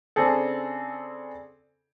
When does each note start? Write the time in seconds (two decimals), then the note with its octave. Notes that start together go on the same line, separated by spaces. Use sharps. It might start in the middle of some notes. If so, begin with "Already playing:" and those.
0.16 C#3 C4 D4 G#4 A4